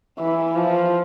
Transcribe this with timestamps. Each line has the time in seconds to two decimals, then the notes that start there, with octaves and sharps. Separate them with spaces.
0.19 E3
0.56 F3